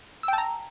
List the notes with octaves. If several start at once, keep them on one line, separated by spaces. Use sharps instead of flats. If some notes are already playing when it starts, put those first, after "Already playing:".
G5 A5 A#5 E6